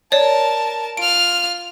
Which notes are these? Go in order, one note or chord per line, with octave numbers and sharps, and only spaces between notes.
A#4 C#5 D5 A5
F4 F6 D7